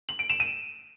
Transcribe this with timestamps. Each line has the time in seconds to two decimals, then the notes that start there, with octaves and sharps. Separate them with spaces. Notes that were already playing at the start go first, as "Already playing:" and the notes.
0.09 F#7
0.19 D7
0.30 E7
0.40 D#7